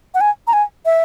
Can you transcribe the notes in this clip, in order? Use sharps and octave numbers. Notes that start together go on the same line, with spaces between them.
F#5
G#5
A#5
G#5
E5